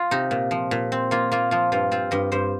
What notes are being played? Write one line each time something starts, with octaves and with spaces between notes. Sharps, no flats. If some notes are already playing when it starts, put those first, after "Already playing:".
Already playing: F4
C3 D#4
A#2
F3
A#2
C4
A#3 F4
A#3 F4
F3 F4
G2 F4
C4 F4
G2 D#5
G2 C5